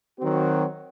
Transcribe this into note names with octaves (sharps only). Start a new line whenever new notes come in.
D#3 F#3 C4 F#4